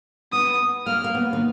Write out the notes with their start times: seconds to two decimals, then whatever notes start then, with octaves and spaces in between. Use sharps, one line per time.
0.32 B3 D#6
0.86 A#3 F6
1.04 A#3
1.15 B3
1.33 D#3